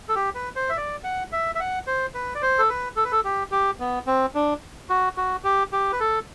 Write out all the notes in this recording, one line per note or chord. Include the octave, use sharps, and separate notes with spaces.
A4
G4
B4
C5
E5
D5
F#5
E5
E5
F#5
C5
B4
D5
C5
A4
B4
A4
B4
A4
G4
G4
B3
C4
D4
F#4
F#4
G4
G4
B4
A4